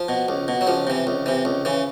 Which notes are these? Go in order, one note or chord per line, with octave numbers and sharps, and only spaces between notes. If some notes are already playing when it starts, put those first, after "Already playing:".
Already playing: F3
B2
C#2
B2
F#3
C#2 F3
C3 E3
C#2
C3 E3
C#2
C#3 E3